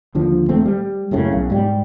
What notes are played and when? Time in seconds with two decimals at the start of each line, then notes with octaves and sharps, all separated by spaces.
0.15 D#2 D3 F3
0.49 D#1 A3 C4
0.66 G3
1.11 F#1 F#2 A2 C#3
1.32 B1
1.50 G#2 G3